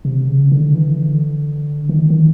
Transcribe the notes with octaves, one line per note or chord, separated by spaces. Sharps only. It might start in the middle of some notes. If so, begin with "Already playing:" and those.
C3
C#3
D3
E3
D3
D#3
D#3